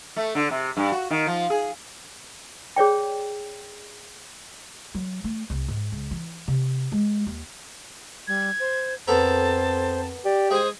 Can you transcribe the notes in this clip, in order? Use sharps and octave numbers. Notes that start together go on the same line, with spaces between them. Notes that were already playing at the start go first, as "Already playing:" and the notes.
A3
D3
C3
G2
F#4
D#3
F3
G#4
G#4 C#5 D5 G5
F#3
A3
C2
G#2
C#2
E3
C3
G#3
D#2
G3 G#6
C5
F2 B3 A4 A#4 C5 A5
G4 D5
G#3 C5 G#5 D#6